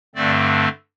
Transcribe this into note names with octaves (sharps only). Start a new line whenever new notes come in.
G2 D3 A3 C4 D5